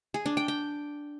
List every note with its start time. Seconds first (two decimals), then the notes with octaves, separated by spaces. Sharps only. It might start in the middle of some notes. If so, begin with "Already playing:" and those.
0.14 G#4
0.26 D4
0.37 G5
0.48 G5